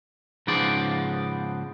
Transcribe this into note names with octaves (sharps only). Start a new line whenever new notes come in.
G#2 C#3 F3 B3 C5 D5